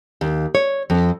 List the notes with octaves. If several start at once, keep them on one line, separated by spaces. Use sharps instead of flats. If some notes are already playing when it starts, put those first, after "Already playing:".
D#2
C#5
F2